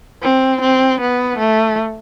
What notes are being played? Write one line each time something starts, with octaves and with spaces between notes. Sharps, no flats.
C4
C4
B3
A3